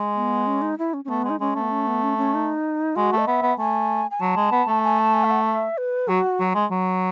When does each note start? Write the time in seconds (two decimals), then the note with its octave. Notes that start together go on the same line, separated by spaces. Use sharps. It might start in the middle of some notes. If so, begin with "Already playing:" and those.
Already playing: G#3
0.16 B3
0.47 C#4
0.62 D#4
0.78 E4
0.94 C#4
1.05 C#4
1.09 A3 B3
1.24 G#3
1.30 D#4
1.40 G#3 C#4
1.55 A3
1.61 B3
1.71 C#4
1.87 B3
2.03 C#4
2.18 C#4
2.34 D#4
2.96 G#3 F#4
3.12 A3
3.17 D#5
3.27 B3 E5
3.42 B3
3.58 A3 G#5
4.11 G#5
4.20 F#3 A5
4.36 G#3
4.52 B3
4.68 A3
4.83 G#5
4.99 A5
5.14 G#5
5.24 E5
5.31 F#5
5.46 E5
5.78 B4
6.08 F#3 F#4
6.40 F#3
6.55 G#3
6.71 F#3